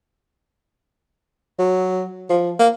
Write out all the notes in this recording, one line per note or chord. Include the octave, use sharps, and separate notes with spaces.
F#3
F3
A#3